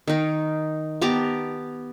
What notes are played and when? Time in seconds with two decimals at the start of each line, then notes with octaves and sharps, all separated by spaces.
0.08 D#3 D#4
1.02 B3 G4 A5 A#5